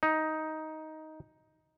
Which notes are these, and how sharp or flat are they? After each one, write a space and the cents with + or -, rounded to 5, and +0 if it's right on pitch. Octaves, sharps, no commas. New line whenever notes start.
D#4 +10